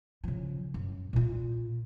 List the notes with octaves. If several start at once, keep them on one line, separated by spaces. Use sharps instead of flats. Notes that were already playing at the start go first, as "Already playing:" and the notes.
C#3 F3
F#2
A#2 F4